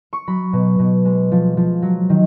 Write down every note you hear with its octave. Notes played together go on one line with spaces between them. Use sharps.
C#6
F#3 B5
B2
B2
G#3
F3
F3
F#3
D#3